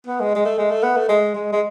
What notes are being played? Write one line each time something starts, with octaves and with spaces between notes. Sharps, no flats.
B3
G#3
G#3
A3
G#3
A3
B3
A3
G#3
G#3
G#3